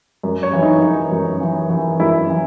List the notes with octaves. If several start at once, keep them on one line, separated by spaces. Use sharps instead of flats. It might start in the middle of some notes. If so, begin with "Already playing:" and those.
F#2
C#5
E3
D#4
E3
F#2
E3
E3
F#2 E4
E3